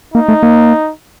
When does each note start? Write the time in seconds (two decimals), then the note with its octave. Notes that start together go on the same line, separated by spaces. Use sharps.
0.14 A#3 D#4
0.28 A3
0.43 A#3